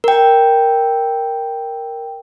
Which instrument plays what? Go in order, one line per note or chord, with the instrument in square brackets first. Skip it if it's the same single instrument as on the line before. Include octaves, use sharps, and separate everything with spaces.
[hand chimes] A#4 G5